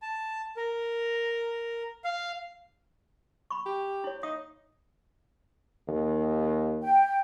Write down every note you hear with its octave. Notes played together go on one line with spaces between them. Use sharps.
A5
A#4
F5
B5 C#6
G4
E4 C#5
D#4 E5 G5 D#6
D#2
G5